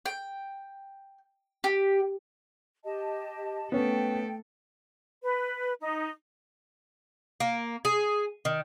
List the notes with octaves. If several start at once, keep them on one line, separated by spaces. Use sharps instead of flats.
G5
G4
G4 D#5 A5
A3 B3 C#4 A4 G5
B4
D#4
A#3
G#4
D#3